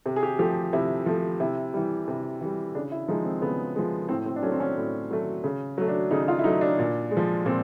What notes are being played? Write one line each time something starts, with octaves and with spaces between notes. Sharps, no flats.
C3
G#4
G4
F3 A3 G4
C3 E4
F3 A3
C3 E4
E3 G3
C3
E3 G3
C#3 D4
E4
F3 G#3 D#4
C4
C#3 B3
F3 G#3
A2 C4
C4
D4
F#3 A3 C#4
C4
C#4
A2
F#3 A3
C#3
F#3 A3
D4
C#3 D#4
F4
E4
F#3 A3 D#4
D4
A#2
G#3
F3
A#2 C4